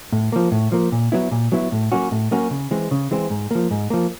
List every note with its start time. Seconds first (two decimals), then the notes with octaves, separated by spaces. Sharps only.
0.12 A2
0.32 F3 A#3
0.52 A2
0.72 F3 A#3
0.92 A#2
1.12 F#3 B3 E4
1.31 A#2
1.52 F#3 B3 E4
1.72 A2
1.92 F#3 A#3 C#4 F#4
2.12 A2
2.31 F#3 A#3 C#4 F#4
2.51 C#3
2.71 E3 G#3 C4
2.91 C#3
3.11 E3 G#3 C4
3.30 G#2
3.51 F3 A#3
3.71 G#2
3.90 F3 A#3